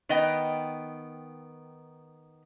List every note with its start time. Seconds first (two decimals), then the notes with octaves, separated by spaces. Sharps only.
0.09 D#3 B3 D#5 G5